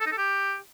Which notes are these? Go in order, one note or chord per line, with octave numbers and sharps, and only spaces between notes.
A4
D#4
A4
G4